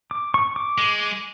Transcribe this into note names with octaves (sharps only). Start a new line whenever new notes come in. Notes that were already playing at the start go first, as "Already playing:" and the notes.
D6
C#6
D6
G#3